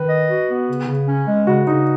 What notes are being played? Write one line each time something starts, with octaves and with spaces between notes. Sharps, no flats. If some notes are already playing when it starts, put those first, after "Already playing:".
Already playing: D#3 B4
D#5
F#4
B3
C#3
C#3
C#4
G#3
C#3 F#4
C#3 D#4